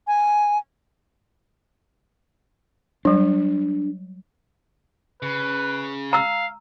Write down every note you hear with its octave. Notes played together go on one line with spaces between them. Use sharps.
G#5
F#3 G3 D4
C#3 B4
F5 A#5 E6